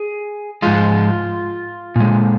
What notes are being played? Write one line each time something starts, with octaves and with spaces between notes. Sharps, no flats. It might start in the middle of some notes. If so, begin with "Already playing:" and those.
Already playing: G#4
G#2 F3 G#3 F4
A#2 G#3